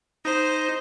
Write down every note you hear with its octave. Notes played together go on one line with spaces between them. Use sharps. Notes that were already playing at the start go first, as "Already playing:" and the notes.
D#4 C5